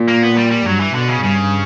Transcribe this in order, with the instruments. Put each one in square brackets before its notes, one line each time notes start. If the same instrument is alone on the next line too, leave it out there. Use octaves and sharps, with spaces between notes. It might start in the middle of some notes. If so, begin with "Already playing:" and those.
Already playing: [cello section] A#2
[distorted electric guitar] A#3
B3
G3
G3
[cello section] G2 [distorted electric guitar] F#3
[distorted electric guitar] E3
[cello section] B2 [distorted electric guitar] D3
[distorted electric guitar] C#3
[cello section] G2 [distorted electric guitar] C#3